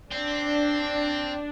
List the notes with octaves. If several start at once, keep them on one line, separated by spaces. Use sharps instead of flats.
C4 D4